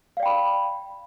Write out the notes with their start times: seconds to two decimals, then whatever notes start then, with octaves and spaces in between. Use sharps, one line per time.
0.17 F5
0.20 D5
0.23 G5
0.26 B5